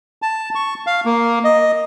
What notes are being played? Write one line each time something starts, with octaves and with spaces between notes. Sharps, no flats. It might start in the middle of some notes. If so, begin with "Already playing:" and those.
A5
C#6
F5
A#3
D#5